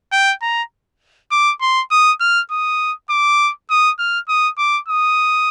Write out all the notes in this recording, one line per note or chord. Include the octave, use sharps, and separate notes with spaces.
G5
A#5
D6
C6
D#6
F6
D#6
D6
D#6
F6
D#6
D6
D#6